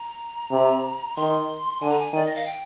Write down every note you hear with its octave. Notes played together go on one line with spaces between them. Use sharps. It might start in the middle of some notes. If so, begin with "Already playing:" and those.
Already playing: A#5
C3
D#3 C6
D3 G#5
A#5
G#5
D#3 D5
D#5
F5
G5